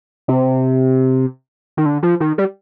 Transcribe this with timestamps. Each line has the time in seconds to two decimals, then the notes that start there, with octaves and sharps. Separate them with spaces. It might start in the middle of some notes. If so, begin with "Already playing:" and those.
0.28 C3
1.77 D#3
1.86 D3
2.03 F3
2.20 D#3
2.38 G3